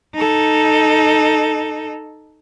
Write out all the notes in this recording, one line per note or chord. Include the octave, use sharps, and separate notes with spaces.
D#4 A4